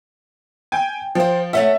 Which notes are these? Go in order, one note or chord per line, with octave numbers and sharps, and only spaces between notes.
G5 G#5
F3 C5 G5
A3 C#4 E5 F#5